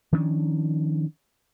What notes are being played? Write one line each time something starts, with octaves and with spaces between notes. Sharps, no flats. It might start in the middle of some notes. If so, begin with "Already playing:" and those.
D#3 F3 C#4 D4